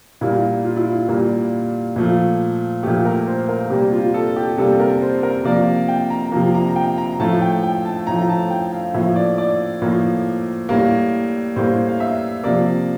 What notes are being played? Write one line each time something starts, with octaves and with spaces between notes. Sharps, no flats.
A#2 G3 A#3 E4
F4
E4
F4
A#2 G3 A#3
A#2 F3 A3
A#2 F3 A3 G4
A#4
C5
A#4
C3 G3 A#3 G4
F4
A4
G4
C3 G3 A#3 A4
A#4
C5
A#4
C3 F3 A#3 D5
G5
A#5
C3 F3 A#3
A#5
G5
A#5
A2 F3 A3 A5
G5
G5
A5
A2 F3 A3 A#5
A5
G5
F5
A2 F3 A#3 E5
D5
D5
A2 F3 A#3
A2 G3 A#3
A2 G3 A#3 C5
F5
E5
C3 F3 A#3 D5